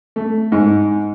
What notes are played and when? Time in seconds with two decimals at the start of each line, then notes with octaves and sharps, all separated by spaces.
0.16 A3
0.52 G#2